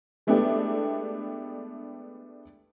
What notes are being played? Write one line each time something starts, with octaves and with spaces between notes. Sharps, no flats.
G#3 A3 B3 D4 E4 G4